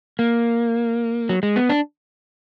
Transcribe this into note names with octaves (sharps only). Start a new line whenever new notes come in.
A#3
F#3
G#3
B3
D4